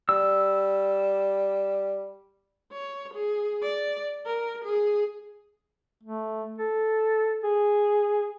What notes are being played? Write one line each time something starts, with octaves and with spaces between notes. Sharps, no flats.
G3 E6
C#5
G#4
D5
A#4
G#4
A3
A4
G#4